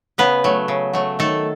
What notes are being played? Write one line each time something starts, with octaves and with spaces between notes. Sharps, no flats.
C#3 B3 B4
F#3 A3
C#3
F#3 A3
D#3 A3 A4